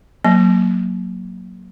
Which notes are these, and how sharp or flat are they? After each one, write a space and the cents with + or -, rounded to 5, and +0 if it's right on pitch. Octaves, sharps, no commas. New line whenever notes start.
F#3 +0 A#3 +0